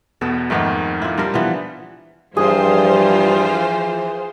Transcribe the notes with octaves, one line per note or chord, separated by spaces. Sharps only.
E2 B2 B3 A4
F2 G#2 D#3 A3 B3 D#4
E4 F4
G3 C4 D4 A#4
E3 F3 B3
G2 E3 F3 F4 G#4 C5